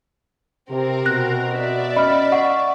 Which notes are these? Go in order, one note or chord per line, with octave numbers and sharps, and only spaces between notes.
C3 C4 A#4
B2 F#4 F#6 A#6
D5 E5
C#4 D#5 B5 F6
F#5 C#6